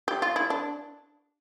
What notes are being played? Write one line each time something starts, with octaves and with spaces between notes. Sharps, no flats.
G4
F4
E4
D4